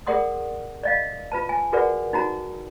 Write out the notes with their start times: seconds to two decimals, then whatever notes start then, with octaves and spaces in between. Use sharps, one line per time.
0.07 G#4 A#4 D5 F#5 C6 D#6
0.83 D5 D#5 F5
1.32 F4 B4 A5
1.49 G#5
1.73 F#4 G#4 A#4 B4 D5 F#5
2.13 D#4 F#4 A#5